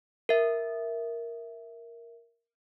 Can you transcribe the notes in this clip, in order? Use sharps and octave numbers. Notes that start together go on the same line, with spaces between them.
A#4 E5